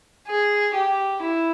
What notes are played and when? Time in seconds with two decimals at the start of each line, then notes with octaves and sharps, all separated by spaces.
0.27 G#4
0.74 G4
1.22 E4